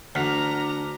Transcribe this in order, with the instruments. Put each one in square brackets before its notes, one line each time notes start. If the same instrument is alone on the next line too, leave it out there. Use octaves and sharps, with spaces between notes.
[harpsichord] D2 [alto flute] D4 [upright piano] F#5 F6 B6 [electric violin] A#5